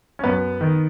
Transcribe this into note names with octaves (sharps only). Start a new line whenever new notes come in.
C#4
F#2 B3
D#3